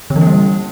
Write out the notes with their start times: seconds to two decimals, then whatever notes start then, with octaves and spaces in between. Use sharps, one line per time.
0.10 D3
0.16 E3
0.21 A#3
0.27 G3